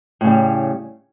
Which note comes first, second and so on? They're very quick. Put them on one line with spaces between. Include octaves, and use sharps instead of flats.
A2 C#3 G3